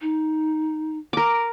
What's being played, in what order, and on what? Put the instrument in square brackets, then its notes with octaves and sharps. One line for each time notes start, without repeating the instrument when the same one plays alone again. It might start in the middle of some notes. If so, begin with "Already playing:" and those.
[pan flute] D#4
[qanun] A#4 D6